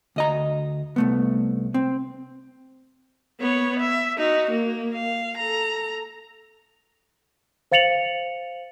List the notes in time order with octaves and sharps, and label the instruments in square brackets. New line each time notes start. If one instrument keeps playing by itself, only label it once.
[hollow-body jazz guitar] D2 D#5 A#5
C2 A3 B3
C4
[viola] B3 C#5
E5
D#4 F#4
A#3
F5
A4 A#5
[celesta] C5 F5 A6 C#7 F7 F#7